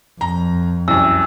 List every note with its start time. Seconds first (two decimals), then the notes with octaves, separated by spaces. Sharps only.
0.21 F2 A#5
0.88 C2 F#2 E6